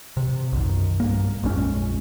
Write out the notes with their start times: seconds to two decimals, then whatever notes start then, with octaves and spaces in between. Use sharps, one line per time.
0.17 C3
0.52 B1 F#2 D#3
1.00 G2 A#3
1.43 A#1 F2 G#3 C#4